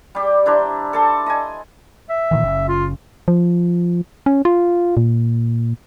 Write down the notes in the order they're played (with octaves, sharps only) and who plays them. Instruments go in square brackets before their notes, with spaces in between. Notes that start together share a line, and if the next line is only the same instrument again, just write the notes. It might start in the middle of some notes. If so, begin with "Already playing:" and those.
[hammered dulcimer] G3 G4
D4 E4 C5 A#5
A4 A5 C6
D#5 G#5
[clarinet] E5
[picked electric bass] A#2 D#3 E3
F#1 C#3
[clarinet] F4
[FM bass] F3
C#4
F4
A#2